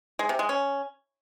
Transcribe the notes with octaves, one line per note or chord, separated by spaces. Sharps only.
G#3
C3
G#3
C#4